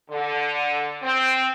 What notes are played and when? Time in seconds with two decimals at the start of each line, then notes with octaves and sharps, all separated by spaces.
0.10 D3
1.02 C4